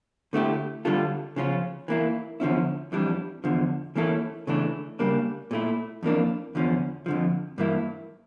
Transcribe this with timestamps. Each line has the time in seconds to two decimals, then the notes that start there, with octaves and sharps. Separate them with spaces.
0.33 D3 A3 E4 G4
0.85 D3 G3 D4 F4 A4
1.36 C#3 F3 C#4 F4
1.88 E3 A#3 E4
2.40 E2 D3 F3 C#4 E4
2.92 F2 E3 G3 D4
3.44 E2 D3 F3
3.95 E3 A#3 C#4 E4 A4
4.47 C#3 E3 A3 D4
4.99 C#3 G3 A#3 D4
5.51 A#2 A3 E4
6.03 F2 E3 A#3 D4
6.55 E2 D3 F3 C#4
7.06 F2 D3 F3
7.58 G2 E3 A#3 E4